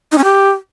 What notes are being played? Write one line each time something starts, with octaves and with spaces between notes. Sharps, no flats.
D#4
C#4
G4